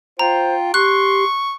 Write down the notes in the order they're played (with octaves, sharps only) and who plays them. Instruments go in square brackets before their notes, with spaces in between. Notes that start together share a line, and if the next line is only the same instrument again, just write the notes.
[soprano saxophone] F4 [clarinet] C5 [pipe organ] G5 [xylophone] A#5
[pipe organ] G4 [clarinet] C6 [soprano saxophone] C#6 [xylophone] F#6